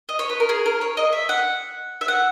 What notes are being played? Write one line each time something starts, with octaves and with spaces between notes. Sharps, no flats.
D#5
C#5
B4
A#4
G#4
A#4
C#5
D#5
E5
F#5
E5
F#5